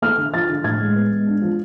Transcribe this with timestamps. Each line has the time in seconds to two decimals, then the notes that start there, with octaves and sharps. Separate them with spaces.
0.02 A3 F6
0.18 D3
0.33 F3 A6
0.49 D3
0.64 A2 G#6
0.80 G#3
0.96 B3
1.11 G#3
1.27 D4
1.42 F3